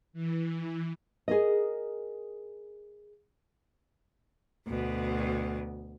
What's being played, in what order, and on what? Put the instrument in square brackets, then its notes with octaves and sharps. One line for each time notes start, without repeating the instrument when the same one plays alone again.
[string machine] E3
[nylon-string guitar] G#4 A#4 D#5
[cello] D2 B2